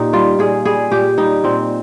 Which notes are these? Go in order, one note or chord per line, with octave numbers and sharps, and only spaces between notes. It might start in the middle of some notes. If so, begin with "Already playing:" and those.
Already playing: A#2 D#4 G4
G3 F4
A#2 G#4
G3 G#4
A#2 G4
G3 D#4
A#2 C4